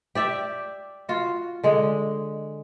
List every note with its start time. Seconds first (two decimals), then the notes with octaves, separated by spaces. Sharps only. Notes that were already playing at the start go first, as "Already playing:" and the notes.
0.15 G4 D5 E5
1.09 F4 F#4
1.64 D3 G#3